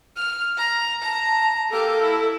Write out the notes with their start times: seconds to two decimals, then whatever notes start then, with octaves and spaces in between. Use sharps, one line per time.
0.16 F6
0.57 A#5
1.02 A5 A#5
1.70 A#3 G4 A4
2.02 E4